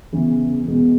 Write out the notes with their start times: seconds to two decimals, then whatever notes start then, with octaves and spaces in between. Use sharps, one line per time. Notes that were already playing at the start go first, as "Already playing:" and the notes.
0.13 E2 C#3 E3
0.66 B2 G#3 B3